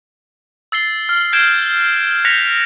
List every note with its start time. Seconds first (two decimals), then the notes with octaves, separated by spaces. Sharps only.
0.72 E6 A6 C7 G7
1.09 F6
1.33 G6 G#6 C7 D7 E7 G7
2.25 F#6 G6 A#6 B6 C#7 F7